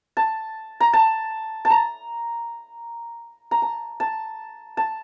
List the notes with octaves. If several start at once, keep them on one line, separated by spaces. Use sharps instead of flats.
A5
A#5
A5
A5
A#5
A#5
A5
A5
A5